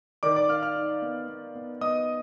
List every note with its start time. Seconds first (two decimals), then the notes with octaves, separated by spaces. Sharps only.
0.23 D#3 D5 D6
0.36 D5 D6
0.49 D#3 F5 F6
0.63 F5 F6
0.76 D#4
1.02 B3
1.29 B3
1.55 B3
1.81 B3 D#5 D#6